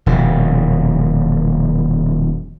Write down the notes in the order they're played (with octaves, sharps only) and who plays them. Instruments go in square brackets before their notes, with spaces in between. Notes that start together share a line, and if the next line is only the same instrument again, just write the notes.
[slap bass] D#1 F2 B2